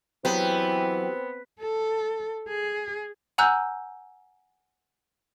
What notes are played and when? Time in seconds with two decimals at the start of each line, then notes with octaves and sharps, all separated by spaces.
0.25 E3 F#3 B3 C4 G4
1.61 A4
2.48 G#4
3.38 F#5 G#5 A#5 E6 F#6 G6